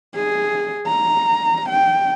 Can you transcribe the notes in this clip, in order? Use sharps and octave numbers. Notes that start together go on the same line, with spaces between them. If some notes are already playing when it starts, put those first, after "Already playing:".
G#4
A#5
G5